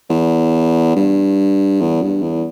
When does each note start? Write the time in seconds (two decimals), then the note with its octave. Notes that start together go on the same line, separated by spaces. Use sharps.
0.10 E2
0.96 G2
1.81 E2
2.02 G2
2.22 E2